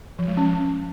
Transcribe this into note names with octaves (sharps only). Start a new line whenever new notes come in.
F3
G#3
C#4